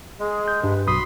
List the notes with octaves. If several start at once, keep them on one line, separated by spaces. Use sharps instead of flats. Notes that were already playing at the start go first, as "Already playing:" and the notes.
G#3 G#4
G6
G2 G4 B4
B1 F#4 B5 C6 D#6